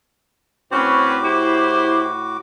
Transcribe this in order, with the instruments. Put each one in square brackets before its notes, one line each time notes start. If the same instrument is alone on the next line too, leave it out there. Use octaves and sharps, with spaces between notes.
[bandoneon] A2 F#4 D6 [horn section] C4 C#4 B4
[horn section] E4 G4 C5